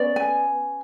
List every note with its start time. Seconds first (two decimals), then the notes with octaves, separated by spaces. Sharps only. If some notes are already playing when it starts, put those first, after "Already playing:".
Already playing: B3 C#4 D5
0.16 G#5